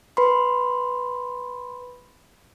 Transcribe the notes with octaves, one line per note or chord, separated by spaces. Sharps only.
B4 B5 C6